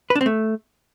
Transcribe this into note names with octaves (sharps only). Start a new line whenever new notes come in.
B4
D4
C4
A3